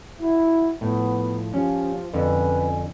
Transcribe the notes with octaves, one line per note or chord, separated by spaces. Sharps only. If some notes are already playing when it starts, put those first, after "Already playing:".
E4 F#4 E5
A2 F3 B3
F3 C#4 G4
F2 D3 C#4 F4 B4 G#5